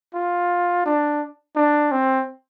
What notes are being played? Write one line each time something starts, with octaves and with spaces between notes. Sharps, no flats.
F4
D4
D4
C4